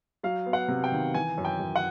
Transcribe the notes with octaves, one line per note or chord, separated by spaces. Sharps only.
F#3 F5
B3
F#5
C3
G5
D#3
E3 G#5
F#2
G5
F#2
F#5